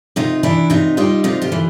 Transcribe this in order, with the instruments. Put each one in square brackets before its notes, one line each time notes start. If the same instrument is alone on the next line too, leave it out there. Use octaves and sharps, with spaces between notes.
[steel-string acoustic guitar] C3 D#4 F4
E3 D4 E4
C3 D#4 F4
G3 D#4 F4
C3 D#4 F4
F4 G4
E3